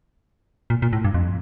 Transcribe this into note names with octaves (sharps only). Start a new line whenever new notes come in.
A#2
A#2
A2
G2
F2